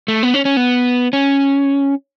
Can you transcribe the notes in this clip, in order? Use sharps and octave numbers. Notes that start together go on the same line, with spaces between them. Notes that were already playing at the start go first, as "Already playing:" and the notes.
A3
B3
C#4
C#4
B3
C#4